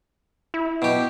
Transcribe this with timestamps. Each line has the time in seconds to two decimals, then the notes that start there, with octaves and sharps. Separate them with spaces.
0.54 E4
0.82 B2 G4